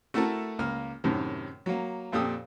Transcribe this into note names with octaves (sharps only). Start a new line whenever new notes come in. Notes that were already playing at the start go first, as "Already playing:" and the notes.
A3 E4 F#4 A4 A#4 A5
C#2 A#3 F6
F#2 A2 C3 D#3
F#3 A#3
F2 A#2 G4 A4 D#6 E6